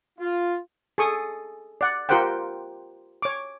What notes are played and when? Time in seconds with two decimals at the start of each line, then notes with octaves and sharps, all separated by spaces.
0.19 F4
0.98 G#4 A4 C#6 D#6
1.81 D5 F#5
2.09 F4 G4 A#4 C5 F#5 G5
3.22 C#5 D6